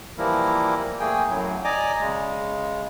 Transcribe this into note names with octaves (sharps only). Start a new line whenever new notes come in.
E3 F3 G3 A#3 E4 A#4
A3 A#3 G#4 G5 G#5
F#2 A2 F#3
D5 D#5 G#5 A#5 D6
C#3 G#3